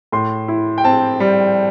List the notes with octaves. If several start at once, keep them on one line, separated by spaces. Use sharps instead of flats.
A2 C6
E4
G5
C4 A5
G3